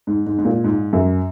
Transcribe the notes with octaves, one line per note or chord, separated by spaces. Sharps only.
G#2
G#2
G#2
A#2
G#2
F#2